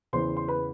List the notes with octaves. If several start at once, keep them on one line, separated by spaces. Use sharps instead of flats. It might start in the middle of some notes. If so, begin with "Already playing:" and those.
E2 C#3 E3 C5 C6
C6
B4 B5